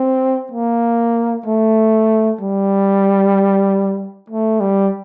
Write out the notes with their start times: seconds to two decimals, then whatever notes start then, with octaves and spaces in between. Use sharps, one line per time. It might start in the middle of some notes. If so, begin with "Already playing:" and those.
Already playing: C4
0.52 A#3
1.46 A3
2.41 G3
4.30 A3
4.60 G3